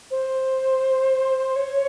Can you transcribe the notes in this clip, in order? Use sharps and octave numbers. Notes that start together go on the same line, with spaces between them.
C5
C#5